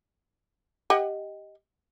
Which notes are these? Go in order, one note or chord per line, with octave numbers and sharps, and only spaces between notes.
G4 D#5 F#5